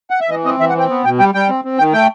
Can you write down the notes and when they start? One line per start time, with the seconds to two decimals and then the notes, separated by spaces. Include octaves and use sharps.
0.10 F#5
0.20 E5
0.29 E3 D#5
0.45 C4 D#5
0.60 E3 E5
0.69 F#5
0.75 C4 G5
0.89 B3
1.05 B2 G5
1.19 G3 G5
1.34 G3 G5
1.49 C4
1.65 C4
1.78 D#3 G5
1.93 A3 G5